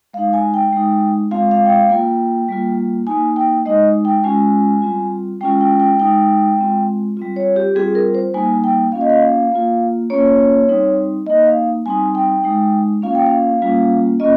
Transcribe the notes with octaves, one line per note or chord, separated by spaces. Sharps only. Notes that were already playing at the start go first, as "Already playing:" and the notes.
G#3 D#4 F5
G#5
G5
G#3 D#4
G#3 C4 F4 F5
F5
G5
F5
A#3 F4 G5
G3 A#3 F4
A#3 D#4 G#5
G5
G#3 D#4 D#5
G5
G#3 C#4 F4 G#5
G3 C4 F4
G#3 C#4 F4 G5
G5
G5
G#3 D#4 G5
G#3 C4 F4
G3 C4 F4
C#5
G4
G3 C4 F4 G#4
A#4
C5
G3 A#3 D#4 G#5
G5
A#3 C#4 F4 F5
D#5
F5
A#3 F4
A#3 C#4 F4 C#5
G3 C4 D#4
A#3 D#4 D#5
F5
G3 C4 D#4 G#5
G5
G#3 D#4
A#3 C#4 F4 F5
G5
F5
G3 A#3 C#4 F4
A#3 C#4 F4 D#5